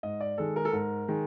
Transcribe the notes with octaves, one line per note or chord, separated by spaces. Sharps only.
G#2 D#5
D5
D#3 G#3 A4
A#4
A4
G#2 A#4
D#3 G#3